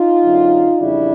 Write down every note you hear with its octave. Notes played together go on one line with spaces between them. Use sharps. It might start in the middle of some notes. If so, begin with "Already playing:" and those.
Already playing: D#4 F4
F#2 D3 F#3
F2 C#3 E3 G3 D4 E4